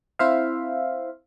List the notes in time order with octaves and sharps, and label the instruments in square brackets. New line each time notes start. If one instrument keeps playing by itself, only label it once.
[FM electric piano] C4 E4 C5 E5 F5